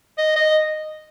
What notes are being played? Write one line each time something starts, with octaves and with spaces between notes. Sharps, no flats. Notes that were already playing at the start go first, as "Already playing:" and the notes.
D#5
D#5